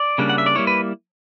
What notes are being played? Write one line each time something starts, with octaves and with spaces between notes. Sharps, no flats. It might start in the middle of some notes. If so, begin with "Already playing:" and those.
Already playing: D5
C#3 G3 A#3 D4
F#5
E5
D5
G3 A#3 E4 C#5
B4